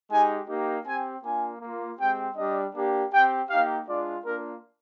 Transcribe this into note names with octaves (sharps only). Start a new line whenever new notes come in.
G#3 D#4 G4 G#5
A#3 D#4 G4
C4 G4 G#5
A#3 D4 F4 G#5
A#3 F4
G#3 C4 G4 G5
G3 D4 G4 D#5
A#3 D4 G4
C4 G4 G5
A#3 D#4 G4 F5
G#3 D4 F4 D5
A#3 D4 F4 A#4